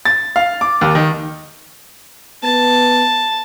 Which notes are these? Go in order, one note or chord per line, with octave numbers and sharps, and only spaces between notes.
A6
F5
D6
D#2
D#3
B3 A5